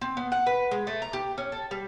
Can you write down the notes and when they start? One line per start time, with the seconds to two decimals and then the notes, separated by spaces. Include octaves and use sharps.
0.01 C4
0.17 B3
0.32 F#5
0.46 B4
0.71 G#3
0.87 A3
1.02 A#5
1.13 G4
1.38 C#4
1.52 A4
1.71 G3